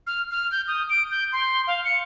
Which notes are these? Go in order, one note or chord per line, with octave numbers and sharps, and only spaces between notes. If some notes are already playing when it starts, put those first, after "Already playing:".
F6
F6
G6
D#6
D7
G6
C6
F5
C#7